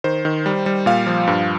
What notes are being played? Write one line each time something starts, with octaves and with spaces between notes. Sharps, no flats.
D#3 C5
D#3
G3
G3
A#2 F5
F3
G2